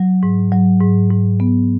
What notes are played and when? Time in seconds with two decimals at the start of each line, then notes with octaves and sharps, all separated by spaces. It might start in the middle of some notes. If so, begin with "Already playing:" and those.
Already playing: F#3
0.23 G#2
0.52 F#3
0.81 G#2
1.11 G#2
1.40 B3